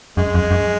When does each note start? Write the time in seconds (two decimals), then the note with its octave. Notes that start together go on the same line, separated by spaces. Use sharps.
0.17 F#2 G#3
0.35 F2
0.51 F#2